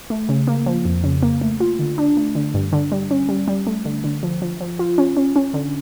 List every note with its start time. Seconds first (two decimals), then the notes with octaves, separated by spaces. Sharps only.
0.10 A3
0.29 C#3
0.47 A#3
0.66 F3
0.85 F2
1.04 C#3
1.23 A#3
1.41 A3
1.60 F4
1.79 D3
1.98 D4
2.17 A3
2.35 D3
2.54 G2
2.73 D3
2.92 G3
3.11 C#4
3.29 G3
3.48 G3
3.67 A3
3.85 D3
4.04 D3
4.23 F3
4.42 F3
4.61 F3
4.79 F4
4.98 C#4
5.17 C#4
5.36 C#4
5.54 D3